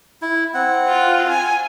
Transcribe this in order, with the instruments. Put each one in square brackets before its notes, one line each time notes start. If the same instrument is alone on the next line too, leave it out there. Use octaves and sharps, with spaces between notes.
[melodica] E4
C4 F#5
[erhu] F4
G#5